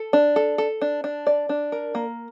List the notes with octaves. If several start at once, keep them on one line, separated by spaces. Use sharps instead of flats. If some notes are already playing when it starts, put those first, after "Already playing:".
Already playing: A4
D4
A4
A4
D4
D4
D5
D4
A#4
A#3